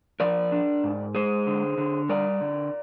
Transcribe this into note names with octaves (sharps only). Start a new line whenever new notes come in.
F3 A#4 D5
D4
G#2
G#3 G#4 C5
D3
D3
G3 A#4 D5
D3